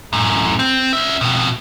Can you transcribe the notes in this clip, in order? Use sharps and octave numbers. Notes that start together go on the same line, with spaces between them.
F#2 A2
C4
C#4 E5
F2 B2